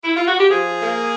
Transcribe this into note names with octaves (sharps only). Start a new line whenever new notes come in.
E4
F4
F#4
G4
F3 G#4
A#3